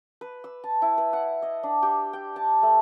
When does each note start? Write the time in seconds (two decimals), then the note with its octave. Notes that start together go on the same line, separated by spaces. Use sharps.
0.21 B4
0.44 E6
0.64 A5
0.82 E4
0.98 B4
1.13 F#5
1.42 D#5
1.63 D4
1.83 G4
2.13 G5
2.36 A5
2.63 A3